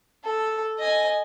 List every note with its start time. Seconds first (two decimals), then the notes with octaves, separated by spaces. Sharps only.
0.24 A4
0.79 D#5 G#5